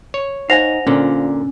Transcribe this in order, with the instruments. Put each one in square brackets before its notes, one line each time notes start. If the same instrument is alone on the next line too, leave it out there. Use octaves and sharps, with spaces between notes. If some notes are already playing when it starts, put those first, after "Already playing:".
[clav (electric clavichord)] C#5
[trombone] D#4 [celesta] C5 A#6 F7 [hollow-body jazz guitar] F5 F#5 G#5
[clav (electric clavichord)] A#2 D3 [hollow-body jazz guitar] C#4 [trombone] F4